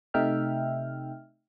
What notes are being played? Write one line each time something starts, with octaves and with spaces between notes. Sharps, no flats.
C3 A3 D#4 E5 G5 F6